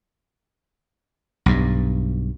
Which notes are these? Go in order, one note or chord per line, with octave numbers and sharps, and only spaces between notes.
B1 G2